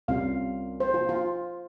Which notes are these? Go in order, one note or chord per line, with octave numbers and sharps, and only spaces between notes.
C2 C3 G3 C#4 F4 F5
C5
F4
F4